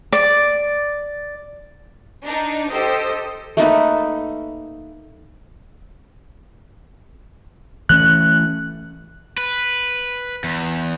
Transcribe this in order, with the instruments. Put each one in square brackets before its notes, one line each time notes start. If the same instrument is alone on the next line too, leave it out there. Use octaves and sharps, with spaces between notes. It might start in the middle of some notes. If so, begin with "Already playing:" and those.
[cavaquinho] D5
[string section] D4 D#4
[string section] G4 C5 [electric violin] A4 D#5
[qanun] A3 A#3 D#4 B4
[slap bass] E3 A3 C#4 [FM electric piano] F#6
[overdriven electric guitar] B4
E2